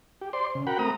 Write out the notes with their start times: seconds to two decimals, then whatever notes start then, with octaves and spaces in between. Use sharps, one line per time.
0.21 G4
0.33 C5 D5 C6
0.55 C#3
0.67 F#4 A#4 F#5 G5 B5
0.79 A3 C4 A#4 A#5 D#6